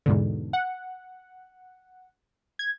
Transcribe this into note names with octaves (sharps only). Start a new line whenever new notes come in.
E2 G#2 B2 D3
F#5
G#6